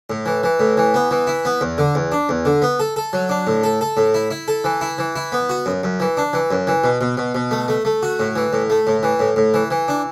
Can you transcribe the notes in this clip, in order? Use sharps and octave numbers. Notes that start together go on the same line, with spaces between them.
A2
E3
E3
A2
E3
B3
E3
E4
B3
E2
D3
E2
D4
E2
D3
B3
A4
A4
F#3
D4
A2
A4
A4
A2
E4
E4
A4
E3
E4
E3
E4
B3
F#4
F#2
F#2
E3
D4
E3
F#2
E3
B2
B2
B2
B2
A3
A3
A3
F#4
A2
E3
A2
A3
A2
E3
A2
A2
E3
E3
D4